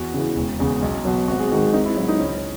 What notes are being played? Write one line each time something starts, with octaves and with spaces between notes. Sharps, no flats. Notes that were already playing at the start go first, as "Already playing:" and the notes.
Already playing: E2 F#4
C#3 E3
E1
E2 C#3
B1
B2 F#3
G#1 F#4
G#4
G#2 D#3 G#3 F#4
G#1 D#4
E4
G#2 F#3 E4
D#4
C#2 C#4